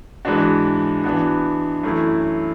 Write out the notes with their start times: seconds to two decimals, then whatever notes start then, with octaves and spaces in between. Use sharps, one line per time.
0.25 G#2 E3 G#3 D4 F#4
1.04 E3 B3 D4 F#4
1.83 F#2 E3 A3 E4